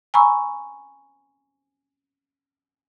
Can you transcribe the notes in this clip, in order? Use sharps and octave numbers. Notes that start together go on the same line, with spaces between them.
G#5 A#5 B5 C#6 E6